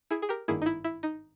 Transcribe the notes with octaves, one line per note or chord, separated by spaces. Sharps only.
E4 G#4
G#4
G4 A#4
G#1 G2 D#3 A#3 E4 G#4
D#4
E4
E4
D#4